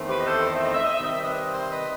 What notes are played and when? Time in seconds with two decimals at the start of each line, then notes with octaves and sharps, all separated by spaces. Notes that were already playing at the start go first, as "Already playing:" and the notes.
Already playing: E2 D#3 A3 C4
0.08 G4 B4
0.19 D#5
0.26 A4 C5
0.44 D#5
0.54 E5
0.64 D#5
0.73 E5
0.84 D#5
0.93 E5
0.99 C3 D#3 G3 C4 D#5
1.13 E5
1.22 B4 D#5
1.52 C5 E5
1.70 B4 D#5